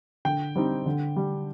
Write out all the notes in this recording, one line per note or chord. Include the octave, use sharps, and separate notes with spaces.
D3 G5
G3 C4 D#4
D3
G3 D4